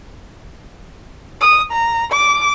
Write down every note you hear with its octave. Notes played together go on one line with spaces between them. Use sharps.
D#6
A#5
D6